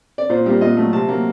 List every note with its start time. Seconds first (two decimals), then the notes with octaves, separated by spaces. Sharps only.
0.18 D5
0.30 A#2 C5
0.46 G3 A#3
0.61 A#2 D#5
0.77 F#3 A3
0.93 C3 A5
1.09 F#3 A#3